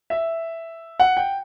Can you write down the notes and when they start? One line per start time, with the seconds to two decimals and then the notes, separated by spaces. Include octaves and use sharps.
0.10 E5
1.00 F#5
1.17 G5